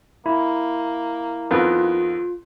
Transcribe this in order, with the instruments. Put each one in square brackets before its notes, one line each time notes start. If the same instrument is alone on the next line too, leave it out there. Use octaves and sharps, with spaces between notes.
[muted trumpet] A#3 [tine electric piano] E4
[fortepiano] F2 D#3 B3 [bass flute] F4